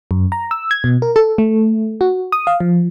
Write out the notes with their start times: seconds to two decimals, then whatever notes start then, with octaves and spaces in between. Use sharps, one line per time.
0.11 F#2
0.32 A#5
0.51 E6
0.71 G#6
0.84 B2
1.02 A#4
1.16 A4
1.38 A3
2.01 F#4
2.32 D#6
2.47 F5
2.60 F3